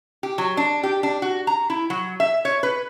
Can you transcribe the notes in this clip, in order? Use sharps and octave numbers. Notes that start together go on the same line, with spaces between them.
G4
F#3
D4
G4
D4
F#4
A#5
E4
F#3
E5
C#5
B4